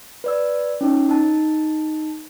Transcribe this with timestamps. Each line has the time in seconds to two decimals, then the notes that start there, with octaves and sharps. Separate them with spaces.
0.24 B4 D5 E6
0.81 C#4 D#4 C#5
1.09 D#4 A5